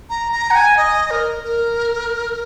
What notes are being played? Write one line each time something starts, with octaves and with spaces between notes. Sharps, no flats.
A#5
A#5
F#5
G#5
D#5
A#4
A#4